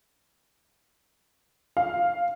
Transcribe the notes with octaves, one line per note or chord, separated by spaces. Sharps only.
F5